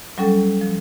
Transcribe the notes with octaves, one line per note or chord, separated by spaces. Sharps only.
F#3 G3 C#4 A4 G5
F3